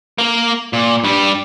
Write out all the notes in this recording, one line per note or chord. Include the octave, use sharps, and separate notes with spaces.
A#3 A#4
A#2
G2 G3